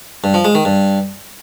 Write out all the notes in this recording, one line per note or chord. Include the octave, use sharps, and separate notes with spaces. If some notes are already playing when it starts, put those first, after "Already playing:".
G2
F3
G#3
D#3
G2